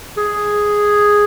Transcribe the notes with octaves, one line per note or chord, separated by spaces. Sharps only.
G#4